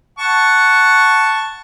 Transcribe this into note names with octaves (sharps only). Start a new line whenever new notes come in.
F#5 A5 C#6